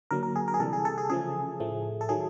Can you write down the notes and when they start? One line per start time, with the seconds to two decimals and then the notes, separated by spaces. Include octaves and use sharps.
0.11 D3 F#3 A#3 A#4
0.23 A#4
0.36 G#4
0.48 A#4
0.54 G#4
0.60 C3 E3 G3 A4
0.73 G#4
0.85 A4
0.98 G#4
1.10 C#3 F3 A3 G#4
1.60 A2 F3 A3
2.01 A4
2.09 D#3 F#3 A3 G#4